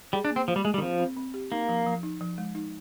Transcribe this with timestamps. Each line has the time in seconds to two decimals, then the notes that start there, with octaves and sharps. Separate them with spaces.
0.13 G3 G#4
0.25 D4
0.30 A#3
0.36 C4
0.48 F3 F4
0.56 G3
0.65 G#3 G#4
0.74 G3
0.78 D#3
0.82 F3 C4
0.99 C4
1.17 C4
1.34 G4
1.51 A#3 D#4
1.69 F3
1.86 F3
2.03 D#4
2.21 F3
2.38 G#3
2.55 D#4